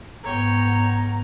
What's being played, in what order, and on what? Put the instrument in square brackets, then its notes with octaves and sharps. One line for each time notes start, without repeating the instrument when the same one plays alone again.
[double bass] G#2 B3 [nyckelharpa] C#5 G5 [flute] A#5